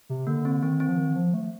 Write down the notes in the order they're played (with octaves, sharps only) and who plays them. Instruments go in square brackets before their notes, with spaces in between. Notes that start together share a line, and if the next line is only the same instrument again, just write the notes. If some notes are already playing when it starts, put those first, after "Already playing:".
[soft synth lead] C3
[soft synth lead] D3 [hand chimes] A#3
[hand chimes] C4
[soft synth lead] D#3 [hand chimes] C4
[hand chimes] C4
[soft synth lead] F3
D#3
F3
A3